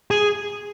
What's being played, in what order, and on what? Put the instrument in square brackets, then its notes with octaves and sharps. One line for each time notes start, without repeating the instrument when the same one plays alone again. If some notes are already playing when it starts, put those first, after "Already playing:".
[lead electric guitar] G#4